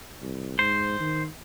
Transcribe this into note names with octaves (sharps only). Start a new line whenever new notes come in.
C2
G#2 C5
D#3